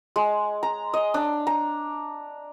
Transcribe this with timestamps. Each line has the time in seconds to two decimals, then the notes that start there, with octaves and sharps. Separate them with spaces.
0.16 G#3
0.63 A#5
0.94 D#5
1.14 D4
1.47 A#5